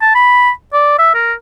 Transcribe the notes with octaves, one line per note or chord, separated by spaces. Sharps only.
A5
B5
D5
E5
A#4